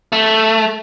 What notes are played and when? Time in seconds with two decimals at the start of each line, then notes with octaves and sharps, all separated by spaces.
0.12 A3